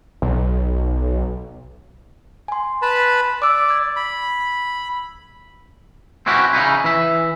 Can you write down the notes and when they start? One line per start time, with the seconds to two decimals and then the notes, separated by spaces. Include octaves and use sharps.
0.22 B1
2.48 G#5 C6
2.82 B4 A5 B5
3.42 D5 D6 E6
3.69 E6 G#6
3.96 B5
6.26 C4 C#4 E4 F#4 G4
6.53 C#3 D#4 E4
6.84 E3 E5